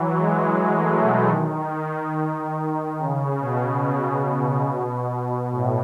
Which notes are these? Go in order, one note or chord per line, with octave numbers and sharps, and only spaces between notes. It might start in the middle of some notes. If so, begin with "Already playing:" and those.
Already playing: E3 F#3
G#3
G#3
A3
B2
D#3
C#3
B2
A2